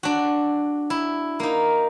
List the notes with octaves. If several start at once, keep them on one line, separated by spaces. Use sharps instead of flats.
D4 F#4
E4
A#3 D#4